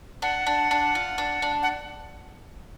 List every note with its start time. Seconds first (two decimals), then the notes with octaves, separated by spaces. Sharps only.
0.22 D4 F#5
0.47 D4
0.71 D4
0.95 F4
1.18 D4
1.42 D4
1.63 F#5